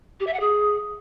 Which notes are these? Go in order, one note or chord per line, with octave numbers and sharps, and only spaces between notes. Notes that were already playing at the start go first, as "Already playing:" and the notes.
G4
E5
F#5
G#4